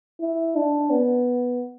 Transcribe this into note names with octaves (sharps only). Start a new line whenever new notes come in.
E4
D4
B3